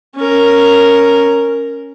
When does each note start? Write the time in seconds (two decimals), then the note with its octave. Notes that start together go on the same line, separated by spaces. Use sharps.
0.16 C#4 A#4